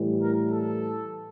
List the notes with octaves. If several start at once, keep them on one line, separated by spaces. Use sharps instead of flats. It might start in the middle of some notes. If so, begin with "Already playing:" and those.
Already playing: A2 E3 G3
A#4
A4